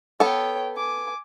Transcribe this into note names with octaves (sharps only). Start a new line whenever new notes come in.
B3 A4 C#5 G5
G#5 D6